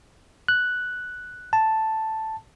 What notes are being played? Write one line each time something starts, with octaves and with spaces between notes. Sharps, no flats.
F#6
A5